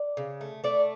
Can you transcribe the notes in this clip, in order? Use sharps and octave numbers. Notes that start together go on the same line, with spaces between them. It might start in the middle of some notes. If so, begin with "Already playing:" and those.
Already playing: D5
C#3
A3
A3 D5